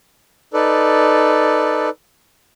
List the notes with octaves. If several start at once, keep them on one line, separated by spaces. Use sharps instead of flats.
D#4 A4 B4 D5